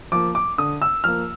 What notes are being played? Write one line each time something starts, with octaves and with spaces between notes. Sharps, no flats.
F3 A#3 D6
D6
D3 D#6
E6
F3 A#3 F6